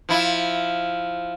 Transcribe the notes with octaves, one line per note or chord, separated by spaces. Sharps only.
F3 E4